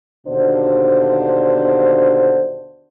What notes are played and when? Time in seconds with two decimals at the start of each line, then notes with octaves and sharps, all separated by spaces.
0.27 D#2 B2 D3 D4 C5